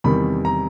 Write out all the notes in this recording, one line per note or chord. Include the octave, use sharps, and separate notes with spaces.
E2 C3 D#3 G3 B5
A#5